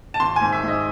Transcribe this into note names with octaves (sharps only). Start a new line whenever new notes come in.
A5
G#1 C6
G#5
G#2
E5
G#2 D#5